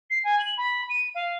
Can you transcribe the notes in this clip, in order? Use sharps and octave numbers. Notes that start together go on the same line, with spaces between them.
C7
G#5
F#7
B5
D#7
F5